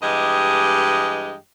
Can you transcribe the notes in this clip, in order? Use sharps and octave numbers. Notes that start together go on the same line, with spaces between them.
G2 E3 G#3 G4 D#5